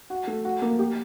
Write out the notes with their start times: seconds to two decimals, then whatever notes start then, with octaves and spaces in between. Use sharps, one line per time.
0.10 F#4
0.27 A3
0.45 F#4
0.62 A#3
0.79 G4